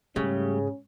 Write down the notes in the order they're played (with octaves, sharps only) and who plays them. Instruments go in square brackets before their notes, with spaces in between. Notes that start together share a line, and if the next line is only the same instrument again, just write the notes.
[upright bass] G#2 [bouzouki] C#3 [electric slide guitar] G3 A3 G4 [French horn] C#4